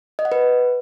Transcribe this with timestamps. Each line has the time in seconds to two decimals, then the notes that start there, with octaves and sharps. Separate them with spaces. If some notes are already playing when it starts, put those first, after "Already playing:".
0.19 D#5
0.25 F#5
0.32 B4